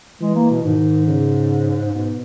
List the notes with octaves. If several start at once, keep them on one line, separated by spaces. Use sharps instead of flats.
E3 G#3
A#3
B2
G#2 D#3
C#3
G#2 B2